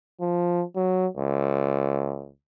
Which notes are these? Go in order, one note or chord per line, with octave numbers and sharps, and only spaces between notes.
F3
F#3
C#2